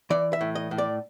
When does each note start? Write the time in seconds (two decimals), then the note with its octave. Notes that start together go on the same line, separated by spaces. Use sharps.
0.10 E3 D5
0.33 E5
0.41 A2
0.55 D#5
0.71 A2
0.78 D5